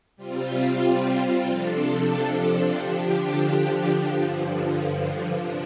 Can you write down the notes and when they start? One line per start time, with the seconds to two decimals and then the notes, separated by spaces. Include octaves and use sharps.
0.17 C3 G3 C4 F4
1.45 C3 F3 D4 A4
2.75 D3 F3 D4 G4
4.04 G2 D3 F3
5.33 C3 F3 D4